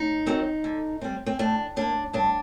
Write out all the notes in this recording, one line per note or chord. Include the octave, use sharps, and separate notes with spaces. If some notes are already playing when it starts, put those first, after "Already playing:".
Already playing: D#4
D#3 F#3 C4
D3
G3 C4
C4
A2 D4
G3 A#3 D4
G2 D4